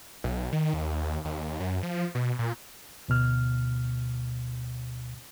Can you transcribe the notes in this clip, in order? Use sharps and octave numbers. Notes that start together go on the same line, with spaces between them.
B1
D#3
D#2
D#2
F#2
F3
B2
A#2
D2 B2 F6